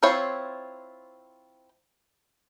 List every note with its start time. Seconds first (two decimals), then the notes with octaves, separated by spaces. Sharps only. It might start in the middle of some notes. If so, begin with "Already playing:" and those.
0.03 C4 E4 F4 C5 C#5